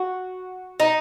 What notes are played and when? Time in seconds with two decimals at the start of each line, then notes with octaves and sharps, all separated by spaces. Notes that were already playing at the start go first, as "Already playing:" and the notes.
Already playing: F#4
0.80 D#4